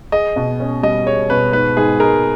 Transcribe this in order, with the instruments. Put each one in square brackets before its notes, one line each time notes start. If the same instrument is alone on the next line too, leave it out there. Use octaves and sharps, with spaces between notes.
[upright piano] G#4 [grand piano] D#5
[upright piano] B2
C#4
[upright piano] G3 [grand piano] D#5
[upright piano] G#4 [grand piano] C#5
[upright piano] B2 [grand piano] B4
[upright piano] G#2 [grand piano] B4
[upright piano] G#2 [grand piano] G#4
[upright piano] G#3 [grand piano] A#4